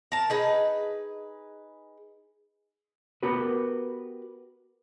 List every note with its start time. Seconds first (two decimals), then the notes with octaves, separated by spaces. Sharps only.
0.12 A#4 A5
0.30 D#4 G#4 B4
3.23 B3 F#4 G4 A#4 B4